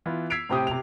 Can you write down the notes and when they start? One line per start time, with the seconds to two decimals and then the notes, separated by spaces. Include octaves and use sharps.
0.06 E3 B3 F4
0.30 E6 G#6 B6 C7 D7 F7
0.49 A2 C3 C4 G4 D#6
0.67 C3 F7